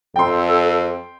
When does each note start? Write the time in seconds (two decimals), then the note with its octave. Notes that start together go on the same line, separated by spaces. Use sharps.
0.16 F2 A4 G5 C6